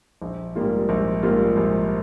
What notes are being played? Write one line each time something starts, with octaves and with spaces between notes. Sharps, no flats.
A#1
G#2 G3 A#3 F4
A#1
G#2 G3 A#3 F4
A#1